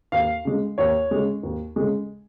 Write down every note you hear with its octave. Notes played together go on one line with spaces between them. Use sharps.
D#2 F5
C#3 G#3
D#2 C#5
C#3 G#3
D#2
C#3 G#3